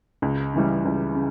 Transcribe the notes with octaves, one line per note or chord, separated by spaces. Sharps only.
C#2
C#3 E3 G3
C#2
C#3